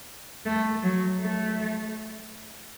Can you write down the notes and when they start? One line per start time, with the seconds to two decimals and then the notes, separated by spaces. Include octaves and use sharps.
0.46 A3
0.83 F#3
1.20 A3